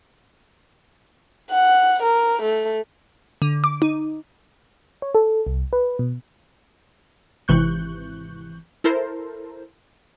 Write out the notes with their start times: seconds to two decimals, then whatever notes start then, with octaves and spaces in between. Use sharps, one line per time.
1.51 F#5
2.02 A#4
2.42 A3
3.42 D3
3.64 D6
3.82 D#4
5.02 C#5
5.15 A4
5.46 C2
5.73 B4
5.99 B2
7.48 G#1 C3 E3 C#6 F#6 G6
8.84 E4 A4 A#4 C5